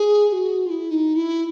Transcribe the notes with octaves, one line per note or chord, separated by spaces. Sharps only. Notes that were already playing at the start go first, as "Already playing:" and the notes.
Already playing: G#4
G#4
F#4
F4
E4
D#4
E4